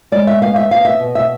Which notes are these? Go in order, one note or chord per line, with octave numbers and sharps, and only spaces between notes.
G#3 D5
E5
B3 F5
E5
B3 F5
E5
B2
E5